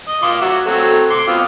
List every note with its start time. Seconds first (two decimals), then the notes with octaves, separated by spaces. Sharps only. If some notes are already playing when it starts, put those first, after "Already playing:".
0.08 D#5
0.23 F4 C6 D6
0.41 F#3 F#4 E5
0.65 F#3 A3 C4
1.10 C6 D6
1.27 B3 C4 F4